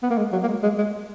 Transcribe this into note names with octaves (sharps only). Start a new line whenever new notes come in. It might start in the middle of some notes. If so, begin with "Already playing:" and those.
B3
A#3
G#3
F#3
A#3
G#3
G#3
G#3